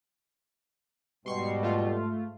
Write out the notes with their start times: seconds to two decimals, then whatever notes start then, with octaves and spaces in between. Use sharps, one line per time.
1.26 G#2 B2 G3 C6 C#6 C7
1.63 A3 F4